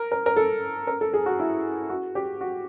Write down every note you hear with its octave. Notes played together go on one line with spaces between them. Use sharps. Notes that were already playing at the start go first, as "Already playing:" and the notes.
Already playing: A#4
A#4
A#4
A4
A#4
A4
G#4
F#4
E4
F#4
G4
F#4